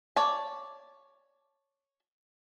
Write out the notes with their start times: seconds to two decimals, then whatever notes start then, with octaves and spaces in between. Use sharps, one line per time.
0.16 C#5 D5 A5